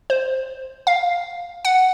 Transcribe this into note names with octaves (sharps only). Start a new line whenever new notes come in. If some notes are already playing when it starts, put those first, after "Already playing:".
C5
F5
F#5